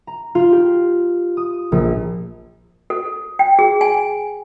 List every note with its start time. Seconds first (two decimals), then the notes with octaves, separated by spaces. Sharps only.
0.07 A#5
0.35 F4
0.52 G4
1.37 D#6
1.72 A#1
2.90 A4
3.39 G5
3.59 G#4
3.81 G#5